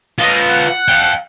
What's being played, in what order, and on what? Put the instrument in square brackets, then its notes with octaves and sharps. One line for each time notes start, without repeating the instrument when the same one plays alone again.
[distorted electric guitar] F4 B4 [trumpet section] D#5
[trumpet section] F#5
[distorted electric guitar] F5 G5